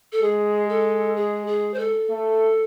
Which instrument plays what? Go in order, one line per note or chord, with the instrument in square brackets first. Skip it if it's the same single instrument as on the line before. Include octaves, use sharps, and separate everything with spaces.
[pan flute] A4
[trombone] G#3 [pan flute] G#4
[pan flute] A4
G#4
G#4
C5
A4
[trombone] A3